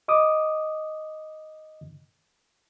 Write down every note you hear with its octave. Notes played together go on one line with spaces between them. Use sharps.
D#5 D6 D#6